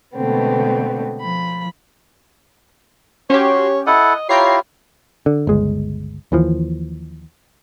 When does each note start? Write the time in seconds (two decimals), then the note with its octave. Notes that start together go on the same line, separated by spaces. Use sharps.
0.15 B2 D3 G#3 A3 B3 C4
1.21 F3 B5
3.30 C#4 F#4 G4 C#5 C6
3.87 E4 A4 D#5 F#5
4.29 E4 F4 G4 C#5 G5 A#5 C7
5.26 D3
5.47 G1 C#2 G#3
6.32 D#2 E3 F3